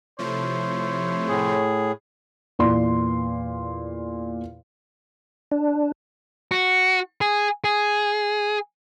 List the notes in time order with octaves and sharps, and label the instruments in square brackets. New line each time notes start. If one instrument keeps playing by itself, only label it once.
[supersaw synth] C3 F3 A3 [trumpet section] E4 C5 C#5
[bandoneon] A2 G#4
[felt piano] E2 A#2 D5 C6
[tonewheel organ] D4
[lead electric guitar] F#4
G#4
G#4